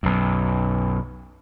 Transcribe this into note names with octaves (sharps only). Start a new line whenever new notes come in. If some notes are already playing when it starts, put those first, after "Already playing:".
B1 F#2